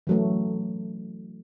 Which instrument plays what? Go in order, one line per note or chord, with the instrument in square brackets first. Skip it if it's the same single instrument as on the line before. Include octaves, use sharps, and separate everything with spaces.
[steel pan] E3 F#3 A3